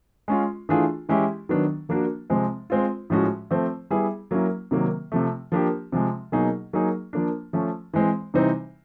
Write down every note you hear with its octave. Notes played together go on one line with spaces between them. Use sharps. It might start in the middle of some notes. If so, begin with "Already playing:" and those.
G#3 C#4 F4
E3 A3 D4 F4 G#4
E3 G#3 C#4 E4 G4
D#3 F#3 B3 D4
F3 A#3 D4 F#4
C3 F3 G#3 C4
G#3 C4 F4
A2 F3 G#3 C#4 F#4
F3 A3 C4
G3 B3 E4 G#4
F#3 A#3 C#4 E4
C3 D#3 F#3 A#3
C3 F3 A3
F3 A#3 D4 G4
C3 F3 G#3
B2 F#3 A#3 D#4 G#4
F#3 A#3 D#4 G#4
F3 A#3 D4
F3 A3 C#4
E3 G#3 C4
C3 E3 G3 C4 D#4